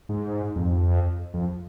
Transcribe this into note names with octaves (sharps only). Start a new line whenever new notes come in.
G#2
F2
F2